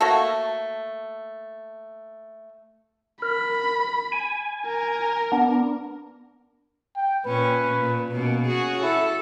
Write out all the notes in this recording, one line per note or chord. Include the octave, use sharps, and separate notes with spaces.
A3 A#3 F#4 A4
A#4 B5
G#5
A#4
B3 D4
G5
A#2 C#4 B4
A#2
B2 A#3 C#4
F#4 G#4
E4 A4